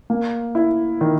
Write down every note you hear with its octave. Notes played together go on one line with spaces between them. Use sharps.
A#3
E4
D#3